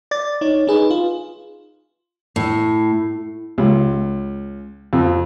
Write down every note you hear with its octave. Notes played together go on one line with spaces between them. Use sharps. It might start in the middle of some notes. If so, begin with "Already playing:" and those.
D5 A6
D#4 C#5
D#4 G#4 B4
F4
A2
C#2
F2